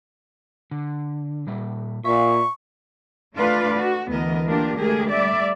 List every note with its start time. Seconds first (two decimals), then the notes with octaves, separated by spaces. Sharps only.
0.71 D3
1.47 A#2 G3 E5
2.05 A#2 E5 F5 C#6
3.36 A3 D4 F4 B4 D5 F5
3.77 F#4
4.08 D2 E3 B3 A#4 D#5
4.46 A3 A#3 D4 F4 G4 A#4
4.78 D3 G#3 A3 G4 G#4 A#4
5.09 G3 A3 D5 E5